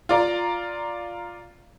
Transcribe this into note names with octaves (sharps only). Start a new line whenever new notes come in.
F4 D5 A#5